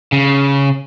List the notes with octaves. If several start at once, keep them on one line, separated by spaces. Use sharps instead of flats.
C#3